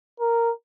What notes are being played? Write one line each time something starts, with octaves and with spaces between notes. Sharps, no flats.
A#4